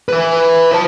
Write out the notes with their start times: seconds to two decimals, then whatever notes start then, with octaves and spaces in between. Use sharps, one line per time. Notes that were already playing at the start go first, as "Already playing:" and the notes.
0.08 B4 E5
0.73 C5 A5